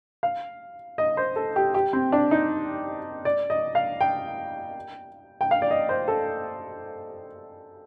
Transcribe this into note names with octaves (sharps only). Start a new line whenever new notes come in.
F5
D#5
C5
A4
G4
G4
C4
D4
D#4
D5
D#5
F5
G5
G5
F5
D5
D#5
C5
A4